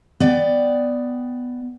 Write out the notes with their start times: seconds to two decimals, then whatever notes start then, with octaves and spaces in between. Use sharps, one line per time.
0.20 B3 D5 G5